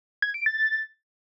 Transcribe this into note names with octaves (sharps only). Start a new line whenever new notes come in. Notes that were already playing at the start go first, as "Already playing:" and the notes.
G#6
D7
A6
A6